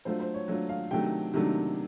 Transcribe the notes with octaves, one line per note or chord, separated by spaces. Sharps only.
F#3 A3 D4 F4 C5
C5
C#5
F#3 A3 D4 F4 C#5
F5
C3 D#3 F#3 A3 D4 G5
C3 D#3 F#3 A3 D4